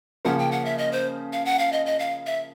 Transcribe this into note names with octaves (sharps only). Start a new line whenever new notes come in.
C#3 F3 A#3 C#4 F#5
G5
F#5
E5
D#5
C5
F5
F#5
F5
D#5
D#5
F5
E5